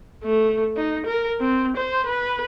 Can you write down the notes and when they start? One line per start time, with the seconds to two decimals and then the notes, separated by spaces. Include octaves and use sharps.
0.24 A3
0.77 D#4
1.06 A#4
1.40 C4
1.77 C5
2.06 B4